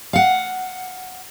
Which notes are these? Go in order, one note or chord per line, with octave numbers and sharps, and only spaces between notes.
F5 F#5